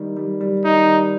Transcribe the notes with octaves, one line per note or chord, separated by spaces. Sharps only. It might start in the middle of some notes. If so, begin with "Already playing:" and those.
Already playing: D#3 G3
G3
G3
D#3 D#4
G3